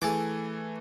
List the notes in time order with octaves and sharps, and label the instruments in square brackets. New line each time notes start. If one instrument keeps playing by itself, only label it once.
[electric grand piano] E3 A3 [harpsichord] G#4 A5 D6